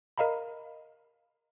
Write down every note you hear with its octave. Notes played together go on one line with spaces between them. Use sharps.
A#4 D#5 F5 A#5 B5